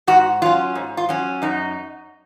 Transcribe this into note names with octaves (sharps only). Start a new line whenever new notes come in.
G#2 F#4
F#3 C#4 F4
G#2
F4
F#3 C#4
F#2 D#4